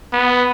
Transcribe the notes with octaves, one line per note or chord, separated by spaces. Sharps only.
B3